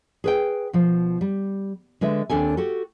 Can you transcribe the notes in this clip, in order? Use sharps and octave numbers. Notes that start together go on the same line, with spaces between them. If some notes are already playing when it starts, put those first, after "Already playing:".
G#4 B4 G5
B2 F3
G3
D3 G#3 B4 E5
D#2 C4 D4 A4 G#5
F#4 G4 A4